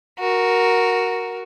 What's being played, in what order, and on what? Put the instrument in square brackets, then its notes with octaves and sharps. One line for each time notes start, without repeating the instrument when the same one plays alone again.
[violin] F#4 A#4